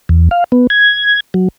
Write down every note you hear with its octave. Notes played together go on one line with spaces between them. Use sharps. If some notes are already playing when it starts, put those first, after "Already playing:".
E2
F5
B3
G#6
F#3